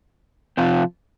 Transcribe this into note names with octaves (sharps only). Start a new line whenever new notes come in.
C3 F3 C4 F4